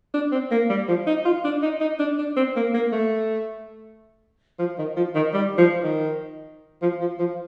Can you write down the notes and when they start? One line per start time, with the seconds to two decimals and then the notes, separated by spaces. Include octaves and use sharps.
0.14 D4
0.32 C4
0.51 A#3
0.70 G3
0.88 F3
1.07 D#4
1.25 F4
1.44 D4
1.62 D#4
1.81 D#4
1.99 D4
2.18 D4
2.37 C4
2.56 A#3
2.74 A#3
2.92 A3
4.59 F3
4.78 D#3
4.96 F3
5.15 D#3
5.34 G3
5.58 F3
5.83 D#3
6.82 F3
7.00 F3
7.19 F3